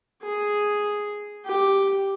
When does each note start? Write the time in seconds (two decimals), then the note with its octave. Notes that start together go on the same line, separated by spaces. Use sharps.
0.22 G#4
1.46 G4